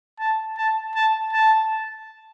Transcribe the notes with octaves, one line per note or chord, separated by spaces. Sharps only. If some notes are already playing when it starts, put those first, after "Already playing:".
A5
A5
A5
A5